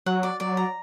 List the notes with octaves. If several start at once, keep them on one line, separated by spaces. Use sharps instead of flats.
F#3 F#5
D5
F#3 D5
A#5